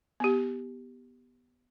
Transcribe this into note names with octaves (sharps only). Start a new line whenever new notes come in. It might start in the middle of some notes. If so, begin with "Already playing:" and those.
B3 G4